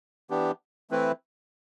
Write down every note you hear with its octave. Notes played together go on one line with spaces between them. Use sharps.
E3 B3 D4 G4
E3 A3 C4 E4 B4